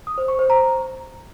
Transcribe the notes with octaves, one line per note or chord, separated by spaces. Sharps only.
D#6
C5
C#6
C5
A#5